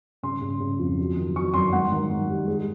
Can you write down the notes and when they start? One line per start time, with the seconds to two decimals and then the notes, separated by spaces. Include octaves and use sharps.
0.23 C#3 C6
0.42 C#3
0.60 C#3
0.79 F2
0.99 F#3
1.17 D#3
1.36 F#3 C#6
1.54 F#2 C6
1.73 G#2 F#5
1.92 D#3
2.10 G#2
2.29 G3
2.47 G#3